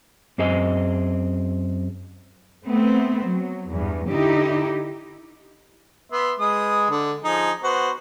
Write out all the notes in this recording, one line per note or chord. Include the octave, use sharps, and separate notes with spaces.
F#2 C4 G#4 D#5 G#5
A3 B3 C4
F#3
E2 G2
D3 D#4 E4 G4
B3 E5 C6
G#3 B4 D#6
D3
F3 D#4 G#4
B3 F#4 C5